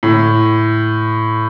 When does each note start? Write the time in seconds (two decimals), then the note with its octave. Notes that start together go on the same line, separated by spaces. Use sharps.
0.03 A2